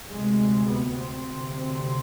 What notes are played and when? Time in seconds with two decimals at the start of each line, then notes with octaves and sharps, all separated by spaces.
0.09 D2 C3 G#3
0.68 B3
0.98 C4
1.27 D2 C3 C4
1.57 C4